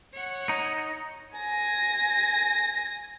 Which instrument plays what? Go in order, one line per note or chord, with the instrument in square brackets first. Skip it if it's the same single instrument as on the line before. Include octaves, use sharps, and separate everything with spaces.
[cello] C#5 F#5
[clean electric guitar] D#4
[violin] G#5 A#6